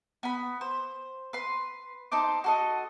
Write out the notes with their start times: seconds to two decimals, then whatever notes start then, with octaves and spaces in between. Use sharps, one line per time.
0.23 B3 B5
0.61 C5
1.33 B4 C6
2.12 D#4 A4 C5 D6
2.44 F#4 A4 D#5